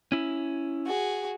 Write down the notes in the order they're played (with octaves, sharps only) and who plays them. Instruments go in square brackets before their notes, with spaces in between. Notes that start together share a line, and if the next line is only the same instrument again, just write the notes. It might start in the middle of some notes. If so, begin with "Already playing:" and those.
[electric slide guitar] C#4 E4
[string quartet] F#4 G#4